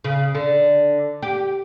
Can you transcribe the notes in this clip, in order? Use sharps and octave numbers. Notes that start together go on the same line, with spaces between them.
C#3
D3
G4